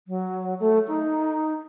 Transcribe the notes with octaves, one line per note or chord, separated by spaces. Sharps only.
F#3
A3
D#4